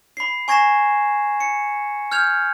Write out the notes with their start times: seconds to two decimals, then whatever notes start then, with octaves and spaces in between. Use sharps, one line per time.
0.17 B5 C7
0.48 G#5 C#6 G#6 A#6 C7 E7
1.40 C#7
2.12 F6 G6 G#6 F7